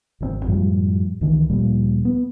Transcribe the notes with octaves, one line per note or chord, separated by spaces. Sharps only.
G#1 C#3 C4
F#2 A2 F3 G3
C#2 D#3 E3
D2 A#2 F3 G3
B3